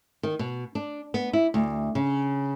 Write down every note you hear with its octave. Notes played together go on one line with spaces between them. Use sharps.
D#3
B2
D4
B3
E4
D2
C#3